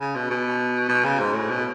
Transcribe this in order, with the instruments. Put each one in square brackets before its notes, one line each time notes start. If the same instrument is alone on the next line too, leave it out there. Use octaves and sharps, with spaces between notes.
[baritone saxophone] C#3
B2
B2
B2
C#3
G#2
A2
B2